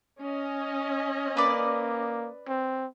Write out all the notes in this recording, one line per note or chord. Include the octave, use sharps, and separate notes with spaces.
C#4 D#5
A#3 B4 D5
C4